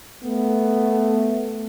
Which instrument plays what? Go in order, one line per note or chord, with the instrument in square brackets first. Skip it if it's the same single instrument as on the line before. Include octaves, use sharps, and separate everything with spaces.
[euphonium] A3 [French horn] B3